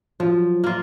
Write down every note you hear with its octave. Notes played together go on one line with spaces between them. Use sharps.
F3 F#3
A#3 F4